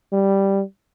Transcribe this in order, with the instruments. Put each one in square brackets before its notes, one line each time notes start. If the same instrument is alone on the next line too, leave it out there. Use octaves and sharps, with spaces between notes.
[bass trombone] G3